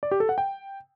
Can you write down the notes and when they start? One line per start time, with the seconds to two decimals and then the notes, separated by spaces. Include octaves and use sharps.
0.03 D5
0.11 G4
0.20 A4
0.29 F#5
0.38 G5